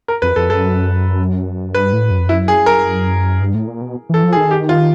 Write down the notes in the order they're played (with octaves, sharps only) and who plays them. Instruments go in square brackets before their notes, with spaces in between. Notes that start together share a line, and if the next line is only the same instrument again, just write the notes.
[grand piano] A#4
[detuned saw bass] F2 [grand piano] B4
[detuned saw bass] F2 [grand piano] A4
[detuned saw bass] F#2 [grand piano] A4
[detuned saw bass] G2 [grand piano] B4
[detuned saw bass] A2
F#2
F2
[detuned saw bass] F#2 [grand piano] E4
[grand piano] G#4
A#4
[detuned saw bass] G2
A2
A#2
B2
[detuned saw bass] E3 [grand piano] A4
[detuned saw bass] F3
[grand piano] G#4
[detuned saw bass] D#3
[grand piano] G4
F4